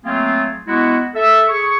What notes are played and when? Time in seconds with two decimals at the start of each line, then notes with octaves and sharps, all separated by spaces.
0.05 F#3 A3 A#3 C4 F4 G#4
0.67 G#3 B3 E4 F#4
1.15 A4 E5
1.48 G#4 C#6